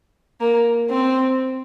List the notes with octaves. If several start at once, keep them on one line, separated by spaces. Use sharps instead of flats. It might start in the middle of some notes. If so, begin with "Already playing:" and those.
A#3
C4